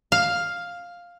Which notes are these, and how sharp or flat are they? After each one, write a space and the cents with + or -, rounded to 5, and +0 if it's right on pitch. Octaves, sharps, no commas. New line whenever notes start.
F5 +5